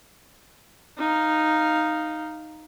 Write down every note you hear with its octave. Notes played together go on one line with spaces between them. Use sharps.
D#4 F5